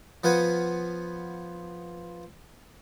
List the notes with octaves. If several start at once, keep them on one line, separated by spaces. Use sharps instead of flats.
F3 B3 F4 B4 F#5 G#5